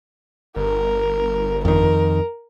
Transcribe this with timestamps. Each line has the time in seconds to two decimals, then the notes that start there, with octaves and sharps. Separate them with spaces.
0.56 G1 A#4
1.65 F2 D#3 A#4